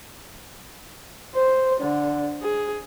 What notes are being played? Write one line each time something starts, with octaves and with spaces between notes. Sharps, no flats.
C5
D3
G#4